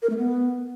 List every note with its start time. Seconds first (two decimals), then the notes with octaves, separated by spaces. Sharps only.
0.02 A#4
0.10 A3
0.17 B3